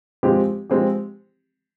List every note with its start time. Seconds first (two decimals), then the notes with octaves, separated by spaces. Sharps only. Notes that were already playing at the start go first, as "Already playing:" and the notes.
0.23 F3 G#3 C4 G4
0.69 F3 G#3 C4 G4